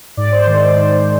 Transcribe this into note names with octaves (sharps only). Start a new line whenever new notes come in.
G#2 D5
C5
D#3 G#3 C5
D5
G#2 C5
G#3